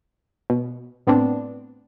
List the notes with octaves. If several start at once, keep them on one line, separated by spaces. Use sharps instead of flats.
B2
A2 B3 C4 D4